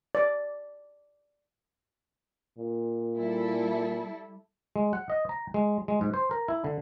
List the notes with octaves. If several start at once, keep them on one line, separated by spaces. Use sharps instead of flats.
D5
A#2
G3 E4 A4
G#3
F#5
D#5
A#5
G#3
G#3
G#2
C5
A#4
E4
D3